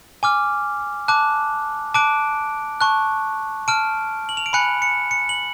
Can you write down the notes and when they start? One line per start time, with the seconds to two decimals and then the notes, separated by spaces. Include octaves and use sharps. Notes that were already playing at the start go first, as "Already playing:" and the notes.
0.23 G#5 D6 F6
1.08 A5 D6 F#6
1.94 A5 D6 F#6 D7
2.81 A5 C#6 F#6
3.68 A5 F6 D7
4.29 F#7
4.37 F7
4.46 D7
4.53 G#5 B5 F#6 C#7
4.82 C#7
5.11 C#7
5.29 F#7